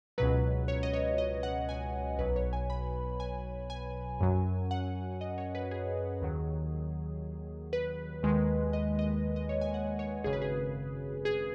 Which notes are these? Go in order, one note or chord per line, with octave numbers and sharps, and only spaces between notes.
C#2 B2 F#3 B4
C#5
D#5
C#5
D#5
F#5
G#5
B1 B2 F#3 B4
C#5
G#5
B5
G#5
G#5
F#2 F#3
F#5
D#5
C#5
B4
G#4
D#2 D#3 F#3
B4
D#2 D#3 G#3
D#5
D#5
D#5
C#5
G#5
F#5
C#5
G#1 F#2 C#3 G#4
B4
G#4
G#4